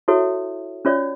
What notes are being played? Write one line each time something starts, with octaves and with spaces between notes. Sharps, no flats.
E4 F#4 A4 C#5 E5
C#4 F4 C#5 D5